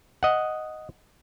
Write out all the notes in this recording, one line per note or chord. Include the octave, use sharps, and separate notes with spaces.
D#5 F#5